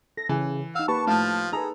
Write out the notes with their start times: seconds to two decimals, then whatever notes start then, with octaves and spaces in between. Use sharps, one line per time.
0.17 A4 A#6
0.29 C#3 E3
0.75 D#4 F5 F#5 E6
0.88 A#3 G4 B4 A5 C#6
1.07 A2 F3 F5
1.53 D#4 G#4 A4 B4 A#5